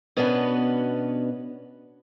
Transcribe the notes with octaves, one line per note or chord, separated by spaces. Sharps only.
B2 B3 C#4 D4 F#4 B4